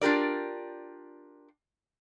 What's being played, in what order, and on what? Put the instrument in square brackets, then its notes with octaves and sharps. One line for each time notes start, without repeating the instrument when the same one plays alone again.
[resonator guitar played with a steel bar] D4 F4 G4 A#4 D5